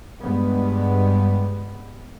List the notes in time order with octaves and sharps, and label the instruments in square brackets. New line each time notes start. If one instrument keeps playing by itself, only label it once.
[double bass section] G2 G3 G#3 B3